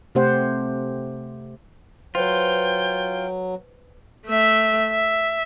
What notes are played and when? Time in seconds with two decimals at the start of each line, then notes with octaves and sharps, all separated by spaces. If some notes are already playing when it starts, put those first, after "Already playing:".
0.15 C3 A3 C4 G4 C5 F#5
2.15 F#3 F4 B4 C5 G5
4.26 A3 E5
4.90 E5